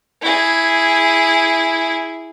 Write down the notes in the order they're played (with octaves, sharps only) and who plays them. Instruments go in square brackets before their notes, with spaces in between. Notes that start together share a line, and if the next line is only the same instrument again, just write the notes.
[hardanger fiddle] E4 G#4